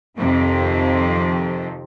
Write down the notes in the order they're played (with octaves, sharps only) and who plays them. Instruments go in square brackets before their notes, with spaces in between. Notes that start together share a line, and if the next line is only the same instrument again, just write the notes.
[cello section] F2 C3 D#3 F3